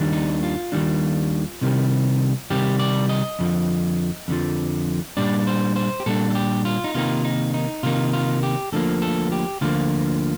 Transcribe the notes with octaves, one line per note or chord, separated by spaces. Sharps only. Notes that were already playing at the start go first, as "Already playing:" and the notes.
Already playing: D#2 D#3 G3 D4
D#4
F4
D#2 D#3 G3 D4
C2 C3 D#3 G3
C2 C3 D#3 G3 G4
D5
D#5
F2 D3 F3
F2 D3 F3
A#2 G3 D4 D5
C5
C5
G4
A#2 G3 D4 A4
A4
G4
F4
D#4
C3 D#3 A#3 D#4 F4
D#4
D#4
C3 D#3 A#3 D#4 F4
F4
G4
D2 D3 F3 A#3 A4
A4
G4
D2 D3 F3 A#3 F4